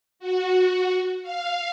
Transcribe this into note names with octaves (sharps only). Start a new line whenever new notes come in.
F#4
F5